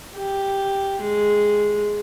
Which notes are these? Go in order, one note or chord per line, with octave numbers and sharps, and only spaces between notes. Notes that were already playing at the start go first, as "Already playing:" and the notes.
G4
G#3